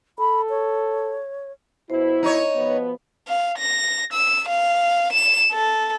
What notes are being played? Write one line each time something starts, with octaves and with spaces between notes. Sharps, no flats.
A4 B5
C#5
B2 E4 C5
D#4 C#5 D#5
B2 F3 B3
F5
A#6
E6
F5
E7
A4